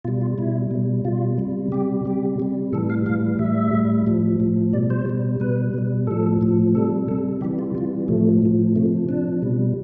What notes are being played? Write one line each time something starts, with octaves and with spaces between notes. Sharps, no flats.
B2 G3 F4
F4
B2 G3 E4
B2 G3
B2 G3 F4
C3 G3
C3 G3 G4
C3 G3 G4
C3 G3
A2 E3 G3 A4
F5
A2 E3 G3 F5
A2 G3 E5
A2 G3
A2 F3
A2 F3
B2 G3 D5
C5
B2 G3
B2 G3 B4
B2 G3
A2 F3 A4
A2 F3
C3 G3 A4
C3 G3 A4
C3 E3 G3 G4
F4
C3 E3 G3 F4
A2 F3 A3
A2 F3
C3 F3 A3
C3 F3 D4
B2 G3